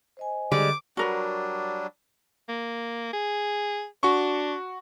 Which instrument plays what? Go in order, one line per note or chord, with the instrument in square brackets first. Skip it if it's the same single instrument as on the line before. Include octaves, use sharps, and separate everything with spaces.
[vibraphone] C5 D#5 G#5
[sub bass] D3 [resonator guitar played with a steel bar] G3 G#3 [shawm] D6
[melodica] F#3 G3 D4 [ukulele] F#4 A#4 B4
[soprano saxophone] A#3
G#4
[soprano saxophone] D4 [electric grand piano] F#4 C#6